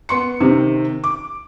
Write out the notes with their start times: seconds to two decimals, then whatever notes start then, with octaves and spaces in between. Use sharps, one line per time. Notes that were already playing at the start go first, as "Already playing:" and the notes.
0.09 B3 C6 C#7
0.40 C3 D#3 C4
1.04 D6